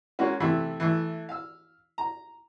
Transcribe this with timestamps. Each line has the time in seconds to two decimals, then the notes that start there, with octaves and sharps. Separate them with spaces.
0.19 G#3 A#3 C#4 F#4
0.40 C3 E3 A3 B5
0.80 E3 A3
1.29 F5 E6
1.98 A#5